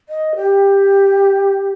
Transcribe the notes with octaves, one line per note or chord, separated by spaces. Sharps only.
D#5
G4